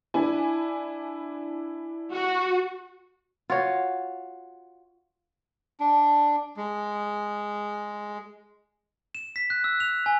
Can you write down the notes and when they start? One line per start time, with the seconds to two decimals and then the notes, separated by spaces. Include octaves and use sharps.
0.14 D4 E4 G#5
2.12 F#4
3.50 F4 F#4 C#5
5.80 D4
6.57 G#3
9.15 E7
9.36 B6
9.50 F#6
9.64 E6
9.80 F7
10.06 G#5